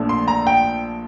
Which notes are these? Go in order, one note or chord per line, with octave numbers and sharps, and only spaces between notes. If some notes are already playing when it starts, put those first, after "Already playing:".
Already playing: A#1 A#2 F3 A3 D4
C6
A#5
G5